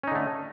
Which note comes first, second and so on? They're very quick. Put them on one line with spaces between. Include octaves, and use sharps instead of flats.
C#4 D#4 D3 A3